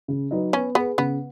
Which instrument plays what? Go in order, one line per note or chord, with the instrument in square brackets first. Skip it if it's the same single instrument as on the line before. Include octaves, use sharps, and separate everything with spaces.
[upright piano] C#3
F#3 D#4 B4 D#5
[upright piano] B3 [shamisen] C#4
[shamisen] B3 [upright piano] G#4 B4
[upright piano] C#3 [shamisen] B3